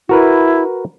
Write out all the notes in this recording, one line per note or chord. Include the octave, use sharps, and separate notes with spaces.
E4 F#4 A#4 B4